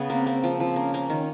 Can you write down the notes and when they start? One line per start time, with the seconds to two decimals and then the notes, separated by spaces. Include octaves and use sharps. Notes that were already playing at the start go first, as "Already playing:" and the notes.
Already playing: C#3 B3 G#4
0.09 A#3 C4
0.27 A#3
0.44 F3
0.60 F3
0.76 A#3 C#4
0.94 A#3
1.10 D#3